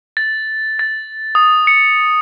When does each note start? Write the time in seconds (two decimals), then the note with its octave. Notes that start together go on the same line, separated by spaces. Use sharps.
0.17 A6
0.79 A6
1.35 D#6
1.67 C#7